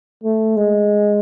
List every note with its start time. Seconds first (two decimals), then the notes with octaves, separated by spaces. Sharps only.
0.24 A3
0.57 G#3